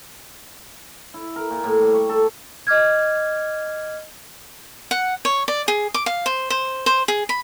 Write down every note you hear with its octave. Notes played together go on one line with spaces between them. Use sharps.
E4
A#4
A#2
A2
G3
C#6
A4
D#5 D6 F6 G#6
F#5
C#5
D5
G#4
D6
F5
C5
C5
C5
G#4
B5